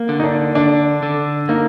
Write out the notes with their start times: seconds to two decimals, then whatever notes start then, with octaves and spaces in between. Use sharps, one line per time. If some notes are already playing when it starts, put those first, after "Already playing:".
Already playing: A#3
0.09 D3
0.20 D#4
0.24 D4
0.55 D3 D4
1.03 D3
1.49 A#3 D#4